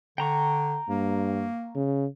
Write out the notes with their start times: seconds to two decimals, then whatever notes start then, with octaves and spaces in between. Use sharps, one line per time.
0.18 D3 G5 A#5 C#6
0.89 G2 A#3
1.75 C#3